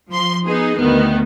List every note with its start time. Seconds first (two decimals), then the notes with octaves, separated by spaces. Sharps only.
0.12 F3 C6
0.46 B3 D#4 G#4
0.78 D2 D#3 B3